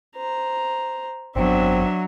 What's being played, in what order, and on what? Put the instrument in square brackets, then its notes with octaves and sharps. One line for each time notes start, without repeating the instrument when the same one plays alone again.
[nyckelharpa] C5 A#5
[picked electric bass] G#1 F#2 B3 [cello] F#3 [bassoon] C4 [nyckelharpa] D4 E5